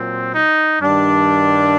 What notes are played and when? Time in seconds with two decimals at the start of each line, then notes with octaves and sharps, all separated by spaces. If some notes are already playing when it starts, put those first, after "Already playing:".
Already playing: A#2 F#3 C4
0.33 D#4
0.81 G2 D#3 G3 D4